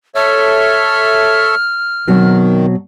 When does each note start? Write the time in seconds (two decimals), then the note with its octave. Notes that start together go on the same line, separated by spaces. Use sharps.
0.15 A4 C#5 E5 F6
2.08 B2 D#3 F#3 C4